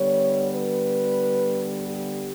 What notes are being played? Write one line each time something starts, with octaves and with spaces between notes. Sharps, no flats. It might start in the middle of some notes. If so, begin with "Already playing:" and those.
Already playing: D3 G3 B3 C#5
B4
G4